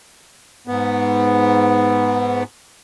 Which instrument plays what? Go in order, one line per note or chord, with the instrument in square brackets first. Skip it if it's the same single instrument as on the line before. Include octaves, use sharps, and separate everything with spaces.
[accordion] G#2 B3